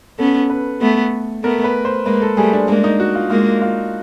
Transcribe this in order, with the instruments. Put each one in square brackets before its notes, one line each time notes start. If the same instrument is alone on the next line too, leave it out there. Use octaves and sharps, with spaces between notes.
[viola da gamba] B3 C#4 [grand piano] A4
[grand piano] B4
[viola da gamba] A3 B3
[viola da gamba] A3 B3 [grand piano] A#4
[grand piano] B4
C5
[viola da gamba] G#3 A#3 [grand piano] B4
[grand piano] A4
[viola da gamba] G3 A3 [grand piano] G#4
[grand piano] D4
[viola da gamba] G#3 A#3 [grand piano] D4
[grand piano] D#4
F#4
F4
[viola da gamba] G#3 A#3 [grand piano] F4
[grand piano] F4